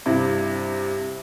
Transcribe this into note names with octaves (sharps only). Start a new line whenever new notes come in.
G2 C3 E4